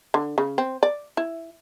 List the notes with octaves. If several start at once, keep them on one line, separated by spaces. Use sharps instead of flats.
D3
C#3
C4
D5
E4